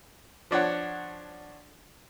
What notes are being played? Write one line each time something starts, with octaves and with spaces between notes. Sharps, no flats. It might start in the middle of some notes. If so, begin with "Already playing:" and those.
F3 D4 C#5 F#5